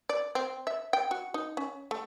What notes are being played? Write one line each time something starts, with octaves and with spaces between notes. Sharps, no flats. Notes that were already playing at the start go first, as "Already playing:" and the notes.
D5
C4
E5
G5
F#4
D#4
C#4
A3